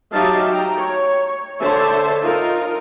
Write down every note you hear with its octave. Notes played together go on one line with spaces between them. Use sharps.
F#3 D#4 G4 E5 F5 A5
G5 A#5
C#5
D3 C5 C#5 E5 A5
D#4 F4 A#4